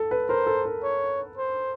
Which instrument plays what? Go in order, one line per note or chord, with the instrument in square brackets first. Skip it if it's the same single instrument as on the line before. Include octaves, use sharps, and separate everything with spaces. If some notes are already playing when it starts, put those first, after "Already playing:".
Already playing: [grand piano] A4
B4
[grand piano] A#4 [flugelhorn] C5
[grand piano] A4
A#4
[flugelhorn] C#5
C5